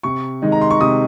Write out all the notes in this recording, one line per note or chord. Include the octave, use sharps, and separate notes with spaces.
C3 C#6
D#3 G#3 D#4
A#5
C6
C#6
C3 D#6